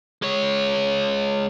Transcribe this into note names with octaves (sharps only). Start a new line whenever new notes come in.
G#3 C#5